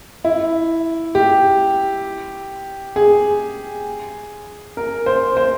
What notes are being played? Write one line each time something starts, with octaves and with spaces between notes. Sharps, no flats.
E4
G4
G#4
A#4
C5
C5